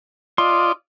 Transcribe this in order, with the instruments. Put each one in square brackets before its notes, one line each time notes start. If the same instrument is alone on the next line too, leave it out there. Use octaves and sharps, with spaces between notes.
[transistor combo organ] F4 D5 D#5 [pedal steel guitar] C6